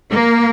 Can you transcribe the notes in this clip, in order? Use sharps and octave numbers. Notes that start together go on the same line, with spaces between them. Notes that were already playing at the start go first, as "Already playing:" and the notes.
A#3